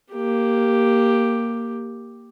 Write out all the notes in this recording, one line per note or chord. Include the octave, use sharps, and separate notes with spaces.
A#3 G4